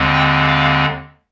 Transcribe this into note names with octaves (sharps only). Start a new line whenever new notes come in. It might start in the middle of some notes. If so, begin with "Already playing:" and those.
Already playing: D#2 D3 G#3 C4
G5
F5